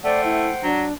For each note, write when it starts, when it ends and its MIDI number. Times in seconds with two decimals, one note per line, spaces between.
0.04 0.54 57
0.04 0.66 72
0.04 0.21 74
0.04 0.66 78
0.04 0.66 79
0.25 0.50 64
0.63 0.86 54
0.63 0.93 62